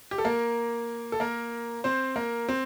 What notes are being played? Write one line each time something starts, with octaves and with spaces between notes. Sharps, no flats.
G4
A4
A#3 A#4
A4
A#3 A#4
C4 C5
A#3 A#4
C4